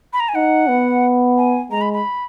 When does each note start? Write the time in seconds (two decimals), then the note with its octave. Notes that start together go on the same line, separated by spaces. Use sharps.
0.13 B5
0.20 A#5
0.29 G#5
0.35 D#4 F#5
0.69 B3
1.37 G#5
1.71 G#3 A#5
1.81 B5
1.93 B5